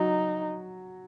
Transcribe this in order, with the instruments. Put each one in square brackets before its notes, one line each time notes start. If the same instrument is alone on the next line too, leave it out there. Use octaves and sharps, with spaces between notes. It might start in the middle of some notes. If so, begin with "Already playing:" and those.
Already playing: [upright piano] F#3 F#4 [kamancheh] D#4